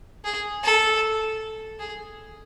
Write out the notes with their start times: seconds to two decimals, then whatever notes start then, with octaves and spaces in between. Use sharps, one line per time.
0.25 G#4
0.63 A4
1.79 G#4